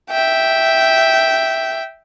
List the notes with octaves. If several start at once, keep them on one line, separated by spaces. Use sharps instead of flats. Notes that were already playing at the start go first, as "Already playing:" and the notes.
E5 G5